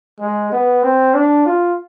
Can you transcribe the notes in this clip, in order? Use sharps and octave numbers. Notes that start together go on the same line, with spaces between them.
G#3
B3
C4
D4
F4